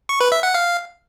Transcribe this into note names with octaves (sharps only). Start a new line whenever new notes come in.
C#6
B4
E5
F#5
F5